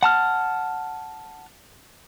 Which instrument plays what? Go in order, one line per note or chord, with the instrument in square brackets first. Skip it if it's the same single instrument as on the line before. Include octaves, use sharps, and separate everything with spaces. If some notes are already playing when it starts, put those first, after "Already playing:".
[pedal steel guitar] F#5 A5 F6